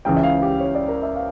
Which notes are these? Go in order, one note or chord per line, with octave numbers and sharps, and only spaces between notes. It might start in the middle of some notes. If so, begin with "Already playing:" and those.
C#2 C#3 E3 G5
E5
F5
G4
C#5
D5
A#4
E5
F5